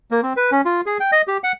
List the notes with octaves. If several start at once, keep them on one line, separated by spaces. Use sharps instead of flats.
A#3
C4
B4
C#4
F4
G#4
G5
D#5
G4
F#5